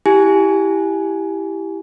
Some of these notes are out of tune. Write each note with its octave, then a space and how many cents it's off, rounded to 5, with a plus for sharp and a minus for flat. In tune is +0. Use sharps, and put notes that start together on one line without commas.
E4 +0 G4 +0 G#5 +20